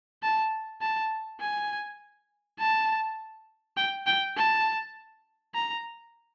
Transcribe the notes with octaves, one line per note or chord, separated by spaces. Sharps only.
A5
A5
G#5
A5
G5
G5
A5
A#5